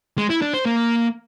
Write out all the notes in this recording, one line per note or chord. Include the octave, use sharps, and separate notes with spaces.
G#3
E4
D4
C5
A#3